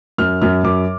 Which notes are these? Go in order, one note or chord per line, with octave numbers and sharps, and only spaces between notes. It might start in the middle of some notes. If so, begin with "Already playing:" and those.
F#2 F6
F#2 F6
F#2 D6